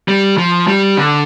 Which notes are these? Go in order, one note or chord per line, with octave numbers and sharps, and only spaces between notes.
G3
F3
G3
D3